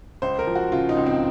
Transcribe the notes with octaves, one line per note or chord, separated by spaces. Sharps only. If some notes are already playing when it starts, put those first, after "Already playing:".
C#2 C5
A#4
F3
F#4
C#3 F4
D#4
C#2
C4